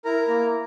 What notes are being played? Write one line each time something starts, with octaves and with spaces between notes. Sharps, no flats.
E4 A#4 A#5
A#3